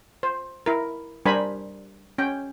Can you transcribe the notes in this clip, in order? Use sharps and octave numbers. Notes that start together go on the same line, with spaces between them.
C5
E4 A#4
G3 D4 A#4 C5 G#5 B5
C#4 G5